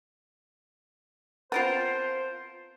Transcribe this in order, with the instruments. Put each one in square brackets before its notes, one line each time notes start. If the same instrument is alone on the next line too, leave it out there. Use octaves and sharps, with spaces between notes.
[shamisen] B3 C4 [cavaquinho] F4 A#4 A5 [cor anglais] C5